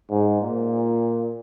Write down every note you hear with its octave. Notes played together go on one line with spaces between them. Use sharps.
G#2
A#2